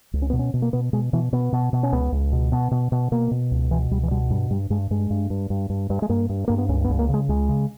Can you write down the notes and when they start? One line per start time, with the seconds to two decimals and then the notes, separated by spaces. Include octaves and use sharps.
0.13 C#2
0.22 C#4
0.30 B2 B3
0.39 C#4
0.54 B2
0.62 A#3
0.73 B2 B3
0.93 B2 G#3
1.13 B2 E3
1.32 B2 B3
1.52 B2
1.73 B2
1.83 C#4
1.92 C#2 B3
2.12 C#2
2.32 B2
2.52 B2 B3
2.71 B2
2.92 B2
3.12 B2 A#3
3.31 B2
3.51 C#2
3.71 B2 E3
3.91 C#2 G3
4.03 E3
4.11 B2 G3
4.30 G2 G3
4.50 G2 G3
4.70 G2 G#3
4.90 G2 G#3
5.10 G2
5.30 G2
5.50 G2
5.70 G2
5.90 G2
6.02 G#3
6.09 G2 A#3
6.30 G2
6.48 G2 A#3
6.58 B3
6.69 C#2 C#4
6.84 B3
6.89 C#2
6.99 A#3
7.09 C#3 G#3
7.29 C#2 G#3
7.49 C#3